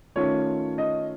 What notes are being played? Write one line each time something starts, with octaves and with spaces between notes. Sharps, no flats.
D#3 A3 C#4 F4 C#5
D#5